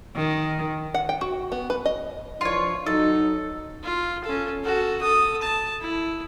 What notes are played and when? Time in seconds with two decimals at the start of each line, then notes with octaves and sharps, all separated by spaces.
0.16 D#3
0.94 F#5
1.09 G5
1.21 F#4
1.52 B3
1.70 B4
1.85 D#5
2.41 E3 F3 D4 F4 C#5
2.86 F#3 D#4 A4
3.83 F4
4.24 C#4 A4
4.63 F#4 A4
5.01 A4 D#6
5.42 A5
5.81 E4